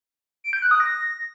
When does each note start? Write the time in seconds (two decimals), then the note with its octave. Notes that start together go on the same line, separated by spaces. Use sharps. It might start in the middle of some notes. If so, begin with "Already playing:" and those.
0.44 D7
0.53 G6
0.62 F#6
0.71 D#6
0.80 A#6